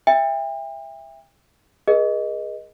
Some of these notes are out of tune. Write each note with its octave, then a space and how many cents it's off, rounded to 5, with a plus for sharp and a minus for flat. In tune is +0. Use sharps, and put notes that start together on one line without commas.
E5 +5 G5 +40
G#4 +0 B4 -40 D#5 +0